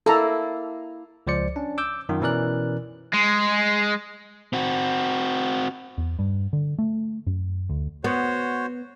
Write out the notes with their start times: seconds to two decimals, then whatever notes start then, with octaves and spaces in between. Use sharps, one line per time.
0.06 A#3 E4 A4 A#5
1.27 C#2 F3 C5 D5 C#7
1.56 C#4 D4
1.78 D6 E6 G6
2.09 F#2 D#3 F4
2.21 B2 E3 C#4 A#4 D5 F#6
3.14 G#3
4.53 C4 F#4
5.98 E2
6.19 G2
6.53 D3
6.79 A3
7.27 F#2
7.70 D2
8.04 B3 F#4 C5 C#5